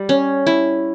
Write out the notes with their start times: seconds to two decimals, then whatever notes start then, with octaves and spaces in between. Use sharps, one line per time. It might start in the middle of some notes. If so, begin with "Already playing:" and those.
Already playing: G3
0.09 C#4
0.47 E4